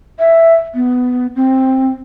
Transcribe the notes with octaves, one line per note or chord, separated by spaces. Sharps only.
E5
B3
C4